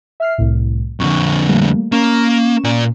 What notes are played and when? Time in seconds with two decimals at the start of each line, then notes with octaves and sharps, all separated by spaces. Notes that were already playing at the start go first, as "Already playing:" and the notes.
0.20 E5 F6 C7
0.38 C2 A2
1.00 F2 D3 C#6
1.48 G3 A3 A#3
1.92 A#3 C#4 C#6 E7
2.64 A#2 D5